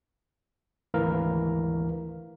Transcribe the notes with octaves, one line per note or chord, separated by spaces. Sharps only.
G#1 D2 E3 A#4 F5